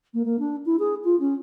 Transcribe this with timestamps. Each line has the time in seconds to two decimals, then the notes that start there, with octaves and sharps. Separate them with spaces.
0.14 A#3
0.25 A#3
0.39 D4
0.65 E4
0.79 G#4
1.04 F4
1.19 C#4